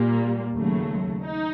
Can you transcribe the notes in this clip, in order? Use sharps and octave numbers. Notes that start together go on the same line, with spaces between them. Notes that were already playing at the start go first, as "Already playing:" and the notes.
Already playing: A#2 G3 A#3
D#2 C#3 F#3 A3
D#4